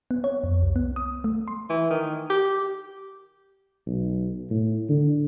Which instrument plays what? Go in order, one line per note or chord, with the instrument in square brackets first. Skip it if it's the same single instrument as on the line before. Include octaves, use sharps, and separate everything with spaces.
[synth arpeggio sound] B3
C#5
F2
C2
B3
D#6
A3
C6
[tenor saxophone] E3
D#3
G4
[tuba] B1
A2
D3